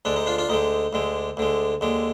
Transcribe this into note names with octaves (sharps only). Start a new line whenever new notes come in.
D2 D3 G#3 D4
D#4
D4 F4
D4 F4
D2 D3 G#3 D#4
D2 D3 G#3
D2 D3 G#3
D#2 D3 G#3